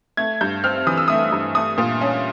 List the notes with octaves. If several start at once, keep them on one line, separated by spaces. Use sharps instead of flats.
A3 G#6
G2 G6
C4 F6
E3 D#6
E6
A3 D#6
G2
A3 D#6
A#2
C#4